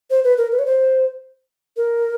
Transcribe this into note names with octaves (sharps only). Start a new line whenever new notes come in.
C5
B4
A#4
B4
C#5
C5
A#4